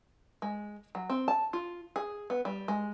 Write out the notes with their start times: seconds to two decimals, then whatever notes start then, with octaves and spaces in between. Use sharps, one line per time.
0.42 G#3
0.95 F#3
1.10 C4
1.28 A5
1.53 F4
1.96 G#4
2.30 B3
2.45 G3
2.68 G#3